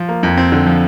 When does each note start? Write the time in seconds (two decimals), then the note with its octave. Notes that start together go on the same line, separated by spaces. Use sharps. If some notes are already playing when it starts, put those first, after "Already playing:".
Already playing: F3
0.09 A#3
0.23 F2
0.37 C4
0.52 D3
0.66 F3